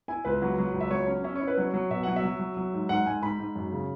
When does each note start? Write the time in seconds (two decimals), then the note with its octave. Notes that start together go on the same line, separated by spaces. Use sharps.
0.08 E4 G#5
0.25 C#2 B4
0.42 F#3
0.58 F#3
0.74 C#2
0.81 E5
0.91 F#3 C#5
1.07 C#4
1.24 C#4 E5
1.36 C#5
1.41 E4
1.47 B4
1.58 F#3 C#5
1.74 F#3
1.90 B2 E5
2.03 F#3 F#5
2.16 E5
2.24 F#3
2.40 F#3
2.57 F#3
2.74 G#2
2.89 G#2 F#5
3.06 G#2 G#5
3.22 G#2 B5
3.40 G#2
3.56 F#2
3.72 C#3